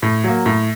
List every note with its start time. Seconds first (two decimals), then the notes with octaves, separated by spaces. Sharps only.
0.02 A2
0.24 F#3 A#3
0.46 A2